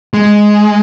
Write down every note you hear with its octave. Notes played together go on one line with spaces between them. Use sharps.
G#3